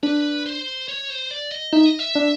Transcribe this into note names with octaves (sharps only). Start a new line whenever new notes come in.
D4 B4
C5
C#5
C5
D5
D#5
D#4 E5
D#5
E5
D4